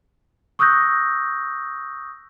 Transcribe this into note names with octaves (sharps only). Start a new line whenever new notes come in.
C#6 D#6 E6 F#6 G6 A#6